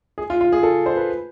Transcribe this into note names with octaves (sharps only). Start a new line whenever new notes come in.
G#4
F4
F4
G#4
A4
C5
B4